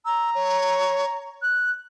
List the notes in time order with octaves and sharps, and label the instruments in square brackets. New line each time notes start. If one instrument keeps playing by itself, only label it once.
[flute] A#5 [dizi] E6
[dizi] C#5
F#6